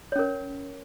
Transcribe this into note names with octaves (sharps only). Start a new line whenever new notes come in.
C#4 A#4 C#5